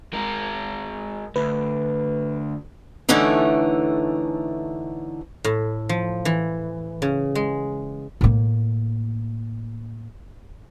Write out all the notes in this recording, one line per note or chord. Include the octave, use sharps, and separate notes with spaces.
G#3 A#4
D2 B4
D3 E3 A3 C#4 D#4
A2
F3
E3
C#3
G#3
A2 A#3